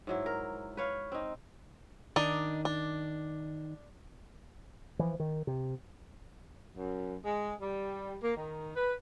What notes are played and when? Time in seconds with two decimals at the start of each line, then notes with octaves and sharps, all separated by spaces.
0.07 G#2 F#3 E4
0.26 A#4
0.77 B4 C#5 F5
1.12 C4 D#4
2.16 D#3 D4 D#4
2.65 D4
4.99 E3 F3
5.20 D#3
5.47 C3
6.76 F#2
7.24 G#3
7.61 G3
8.23 A#3
8.37 D#3
8.75 B4